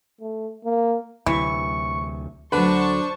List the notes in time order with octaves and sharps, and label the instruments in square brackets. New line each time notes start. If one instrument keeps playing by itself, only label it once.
[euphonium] A3
A#3
[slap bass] D2 C3 F#3 [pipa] E3 [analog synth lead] C#6
[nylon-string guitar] D2 F#3 [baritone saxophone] D4 [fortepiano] B4 [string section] C5 A5 C#6